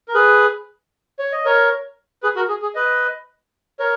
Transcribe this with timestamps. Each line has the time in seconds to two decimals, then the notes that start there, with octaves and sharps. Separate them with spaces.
0.08 A#4
0.14 G#4 B4
1.19 C#5
1.33 D#5
1.46 A#4 C#5
2.23 G#4 B4
2.36 F#4 A#4
2.49 G#4
2.62 G#4
2.75 B4 D#5
3.79 A#4 C#5